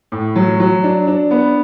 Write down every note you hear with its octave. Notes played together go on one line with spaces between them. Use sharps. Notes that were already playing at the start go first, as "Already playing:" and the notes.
A2
F#3
F#3
D4
D4
B3